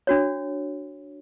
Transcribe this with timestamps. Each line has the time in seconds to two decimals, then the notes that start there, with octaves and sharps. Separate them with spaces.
0.07 D4 F#4 C#5